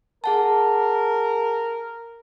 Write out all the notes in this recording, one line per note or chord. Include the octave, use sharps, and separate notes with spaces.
G#4 A#4 F#5 A5